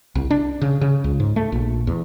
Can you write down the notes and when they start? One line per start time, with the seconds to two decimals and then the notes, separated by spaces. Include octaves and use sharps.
0.15 C2
0.30 D4
0.62 C#3
0.81 C#3
1.04 C#2
1.20 G#2
1.36 A3
1.52 A#1
1.87 E2